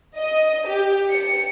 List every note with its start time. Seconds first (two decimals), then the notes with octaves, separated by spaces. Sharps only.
0.17 D#5
0.66 G4
1.09 C#7